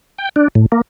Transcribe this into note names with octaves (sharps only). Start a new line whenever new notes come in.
G5
D4
A2
A#3